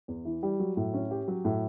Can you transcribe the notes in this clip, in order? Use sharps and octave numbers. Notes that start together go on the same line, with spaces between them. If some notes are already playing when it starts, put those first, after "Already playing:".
E2
E3
G3
F#3
A2
C#4
G4
F#3
A2